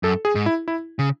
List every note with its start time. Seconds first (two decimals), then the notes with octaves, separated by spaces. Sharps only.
0.03 F#2 A4
0.25 G#4
0.35 G#2
0.46 E4
0.68 E4
0.99 C#3